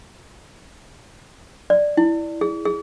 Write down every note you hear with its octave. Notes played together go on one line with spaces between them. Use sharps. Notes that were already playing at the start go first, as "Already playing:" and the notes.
D5
E4
G#4
G#4